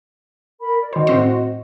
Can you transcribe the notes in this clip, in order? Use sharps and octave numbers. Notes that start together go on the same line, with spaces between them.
A#4 B5
D5
D#3 F#4 C5 D#5
A2 C4 C5